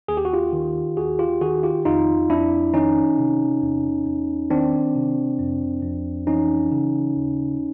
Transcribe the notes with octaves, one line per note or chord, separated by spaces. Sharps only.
D#2 G#4
G4
F#4
F4 G4
D#3
D#2 F#4 G#4
F4 G4
D#3 F#4 G#4
F4 G4
F2 D#4 F4
F2 D4 E4
D#3 C#4 D#4
C3
E2
E2
D#3 C4 D4
C3
F2
F2
E3 C#4 D#4
C#3
D#2